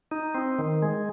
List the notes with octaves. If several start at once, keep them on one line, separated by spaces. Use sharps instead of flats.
D#4
C4
D#3
G#3